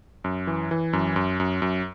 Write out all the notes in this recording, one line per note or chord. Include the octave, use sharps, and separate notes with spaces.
F#2
E3
E3
F#2
F#2
F#2
F#2